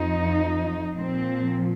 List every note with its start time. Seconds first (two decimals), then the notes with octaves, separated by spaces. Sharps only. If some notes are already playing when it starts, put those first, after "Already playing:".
Already playing: F2 F3 D#4
0.95 A#2 F3 C4